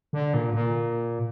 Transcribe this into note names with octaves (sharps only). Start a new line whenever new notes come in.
D3
A#2
A#2